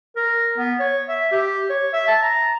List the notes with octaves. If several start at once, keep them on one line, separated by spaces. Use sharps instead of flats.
A#4
B3
C#5
E5
G4
C#5
E5
A5
A#5